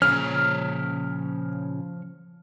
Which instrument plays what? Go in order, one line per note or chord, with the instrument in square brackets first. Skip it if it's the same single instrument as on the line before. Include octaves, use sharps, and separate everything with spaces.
[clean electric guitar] A#2 C#3 C#4 [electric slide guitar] F3 C#5 [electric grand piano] F6